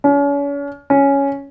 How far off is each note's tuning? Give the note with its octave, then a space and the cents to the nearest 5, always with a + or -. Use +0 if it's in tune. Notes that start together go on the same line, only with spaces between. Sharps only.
C#4 +40
C#4 +5